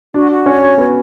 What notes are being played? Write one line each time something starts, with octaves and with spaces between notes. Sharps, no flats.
D4 F#4
F#4
C#4 C#5
F#4
B3 F#4